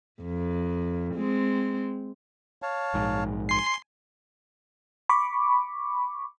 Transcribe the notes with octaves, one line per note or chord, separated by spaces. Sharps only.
F2
G#3 C4
C#5 F5 A5
A#1 G#2
G#5 C6 C7
B5 C#6 D6